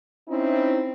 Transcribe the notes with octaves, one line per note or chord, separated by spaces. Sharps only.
C4 C#4 D#4 E4